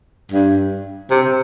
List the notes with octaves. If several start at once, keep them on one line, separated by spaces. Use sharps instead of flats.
G2
C3